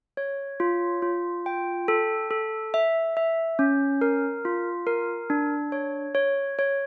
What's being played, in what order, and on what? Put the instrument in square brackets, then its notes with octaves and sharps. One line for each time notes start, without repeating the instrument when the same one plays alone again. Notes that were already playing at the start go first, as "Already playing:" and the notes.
[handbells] C#5
F4
F4
G5
A4
A4
E5
E5
C#4
A#4
F4
A#4
D4
C#5
C#5
C#5